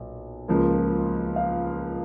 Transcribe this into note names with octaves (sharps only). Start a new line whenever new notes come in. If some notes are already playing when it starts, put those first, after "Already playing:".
Already playing: B1 A#2
C#2 C#3 F3 A#3
F5